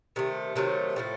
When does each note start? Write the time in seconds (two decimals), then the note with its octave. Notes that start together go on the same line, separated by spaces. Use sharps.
0.16 C3 D#3 A3
0.56 C3 D#3 F#3 A3
0.96 A2 F3 A3